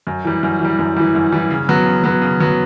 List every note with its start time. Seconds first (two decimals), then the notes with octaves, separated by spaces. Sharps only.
0.07 F#2
0.25 E3 G3
0.43 F#2
0.60 E3 G3
0.79 F#2
0.96 E3 G3
1.15 F#2
1.32 E3 G3
1.50 C#3
1.69 F#3 B3
1.86 C#3
2.04 F#3 B3
2.22 C#3
2.40 F#3 B3